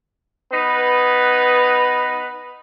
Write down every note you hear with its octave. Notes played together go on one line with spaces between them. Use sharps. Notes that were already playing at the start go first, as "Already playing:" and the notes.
B3 D#4 B4